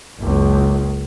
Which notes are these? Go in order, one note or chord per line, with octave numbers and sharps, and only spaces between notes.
F#1 C#2